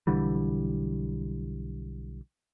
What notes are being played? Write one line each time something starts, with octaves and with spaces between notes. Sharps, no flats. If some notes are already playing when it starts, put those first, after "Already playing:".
B1 D3 E3 G3